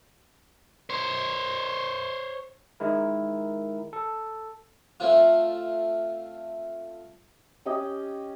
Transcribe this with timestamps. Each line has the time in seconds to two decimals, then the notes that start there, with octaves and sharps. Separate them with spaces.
0.90 C5 C#5
2.80 D#3 G#3 E4 A#4
3.93 A4
5.00 A3 C4 F4
7.66 C#4 G4 D#5